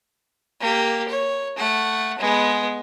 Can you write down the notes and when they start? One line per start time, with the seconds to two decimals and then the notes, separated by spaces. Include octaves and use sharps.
0.61 A#3 G4
1.08 C#5
1.56 A3 F#5
2.19 G#3 B3